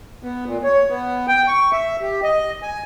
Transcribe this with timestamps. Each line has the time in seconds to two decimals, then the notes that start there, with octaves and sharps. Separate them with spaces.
0.23 B3
0.46 A#2
0.64 C#5
0.89 B3
1.28 G5
1.48 C#6
1.72 E5
2.01 G4
2.23 D#5
2.63 G#5